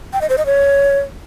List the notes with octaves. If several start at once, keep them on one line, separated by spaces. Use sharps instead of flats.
G5
D#5
C5
D#5
C#5